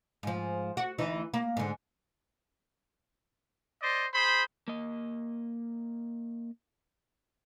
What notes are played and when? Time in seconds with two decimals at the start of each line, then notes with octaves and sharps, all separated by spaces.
0.23 G#2 F3
0.77 F#4
0.98 D2 E3 D#4
1.34 A#3
1.57 G#2 D3
3.81 C5 D5 D#5
4.14 G#4 C5 B5
4.68 A#3 D#5